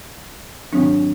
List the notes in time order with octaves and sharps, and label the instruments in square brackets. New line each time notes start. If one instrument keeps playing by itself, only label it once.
[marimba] G#2 D#3 F#3 C4 D4